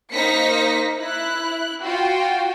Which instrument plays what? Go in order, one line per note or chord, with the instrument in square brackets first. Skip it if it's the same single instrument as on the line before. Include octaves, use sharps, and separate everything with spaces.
[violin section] A#3 D#4 C5 A#6 B6 C#7
E4 F#6
F4 F#4 G5